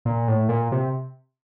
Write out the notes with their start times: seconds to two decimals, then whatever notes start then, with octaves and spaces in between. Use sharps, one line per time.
0.05 A#2
0.28 A2
0.49 A#2
0.72 C3